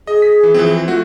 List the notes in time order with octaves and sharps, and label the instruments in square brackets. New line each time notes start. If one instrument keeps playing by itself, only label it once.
[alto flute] G#4 [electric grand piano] D#5
[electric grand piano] B6
E3
E3 F3 C4
[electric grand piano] F3 A3 F#4 [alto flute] F4